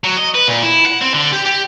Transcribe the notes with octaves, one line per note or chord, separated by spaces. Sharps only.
F#3
D#5
B4
A#2
E4
F#5
C4
D3
G4
G4